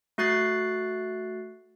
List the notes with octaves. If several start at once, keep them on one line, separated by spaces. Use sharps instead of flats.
A3 F#4 F#6 A6 C7